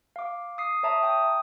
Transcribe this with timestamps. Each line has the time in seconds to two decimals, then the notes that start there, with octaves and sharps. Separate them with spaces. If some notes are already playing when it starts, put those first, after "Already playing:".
0.16 F5 D6
0.58 D#6 C7
0.83 C#5 E5 A5 A#5 D#6
1.03 G5 D#6